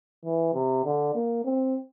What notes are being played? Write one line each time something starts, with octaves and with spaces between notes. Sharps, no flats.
E3
C3
D3
A#3
C4